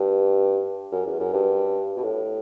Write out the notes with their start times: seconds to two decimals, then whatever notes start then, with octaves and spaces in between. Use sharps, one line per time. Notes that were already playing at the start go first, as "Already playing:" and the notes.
Already playing: G2
0.92 F#2
1.06 E2
1.20 F#2
1.33 G2
1.96 B2
2.03 A2